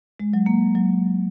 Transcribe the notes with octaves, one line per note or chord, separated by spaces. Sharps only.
G#3
F#3
A#3
F#3